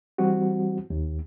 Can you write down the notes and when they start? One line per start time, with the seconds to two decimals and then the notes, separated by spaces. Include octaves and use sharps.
0.18 E3 G3 C4 F#4
0.90 D#2